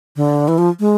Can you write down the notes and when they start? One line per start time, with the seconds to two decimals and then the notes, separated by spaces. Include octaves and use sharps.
0.16 D3
0.48 E3
0.58 F3
0.80 G#3